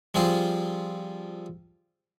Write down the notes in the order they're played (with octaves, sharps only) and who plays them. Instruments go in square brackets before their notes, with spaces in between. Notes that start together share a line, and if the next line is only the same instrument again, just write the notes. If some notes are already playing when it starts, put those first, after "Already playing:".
[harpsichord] F3 G3 C4 F4 G#4